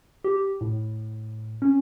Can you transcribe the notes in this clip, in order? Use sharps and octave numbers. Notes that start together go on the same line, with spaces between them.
G4
A2
C#4